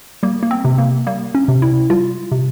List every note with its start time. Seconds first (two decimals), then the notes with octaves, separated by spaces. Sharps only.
0.23 G3 A#3
0.43 A#3
0.51 C4
0.65 C3
0.78 A#3
1.07 G3 A#3
1.35 C#4
1.48 C3
1.62 E4
1.90 G3 F4
2.32 C3